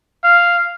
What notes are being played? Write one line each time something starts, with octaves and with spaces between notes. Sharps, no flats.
F5